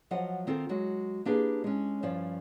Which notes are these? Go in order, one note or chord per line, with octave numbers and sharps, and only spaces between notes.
F3 F#3 F4 D#5 F#5
D#3 C4 F4 A4 A#4
F#3 G#3 F#4
A#3 D4 G4 G#4 B4
G#3 C#4
G2 F3 C#4 D5